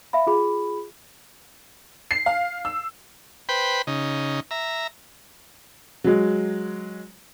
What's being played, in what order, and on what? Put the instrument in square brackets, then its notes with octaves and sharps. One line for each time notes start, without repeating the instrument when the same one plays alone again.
[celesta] E5 F5 B5
F4 G#4 B5
[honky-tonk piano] C7
F5
E6
[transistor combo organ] B4 C5 G5 B5
C#3 D#4
E5 A#5
[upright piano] F#3 G#3